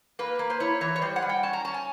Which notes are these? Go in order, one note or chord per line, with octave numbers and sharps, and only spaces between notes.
A#3 B4
A#3
C5
E4 C#5
E3 C#5
C#5
G3 C5
F#5
G3
G5
C#4 A5
A#5
C#4 A5
G#5